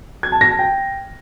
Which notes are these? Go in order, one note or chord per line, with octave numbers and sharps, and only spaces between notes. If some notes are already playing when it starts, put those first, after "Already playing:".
G#6
A5
A#6
A5
G5